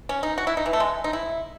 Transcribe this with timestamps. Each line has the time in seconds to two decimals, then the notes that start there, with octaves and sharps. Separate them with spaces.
0.09 C#4
0.23 D#4
0.38 F#4
0.47 E4
0.57 D#4
0.66 E3
0.73 A3
0.80 G#3
1.04 D#4
1.13 E4